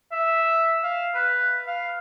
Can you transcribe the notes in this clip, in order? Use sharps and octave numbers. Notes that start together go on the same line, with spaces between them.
E5
F5
B4
F5